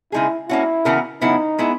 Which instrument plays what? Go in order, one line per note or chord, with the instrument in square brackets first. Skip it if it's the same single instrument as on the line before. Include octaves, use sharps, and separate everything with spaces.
[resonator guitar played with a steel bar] C#3 G#3 D#4 G#4 [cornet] E4
[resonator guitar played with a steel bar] A#3 C#4 F#4 [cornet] E4
[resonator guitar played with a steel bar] C#3 E3 B3 F#4 A#4
[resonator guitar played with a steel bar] C#3 F#3 B3 E4 [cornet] D#4
[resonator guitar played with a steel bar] G#3 B3 E4